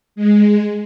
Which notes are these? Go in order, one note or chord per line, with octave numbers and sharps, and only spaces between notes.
G#3